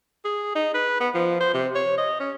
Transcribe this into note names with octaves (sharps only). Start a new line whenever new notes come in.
G#4
D#4
B4
B3
F3
C5
C3
C#5
D#5
C#4